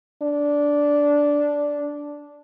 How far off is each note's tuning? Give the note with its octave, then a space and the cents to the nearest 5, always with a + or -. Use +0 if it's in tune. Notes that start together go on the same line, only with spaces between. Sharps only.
D4 -10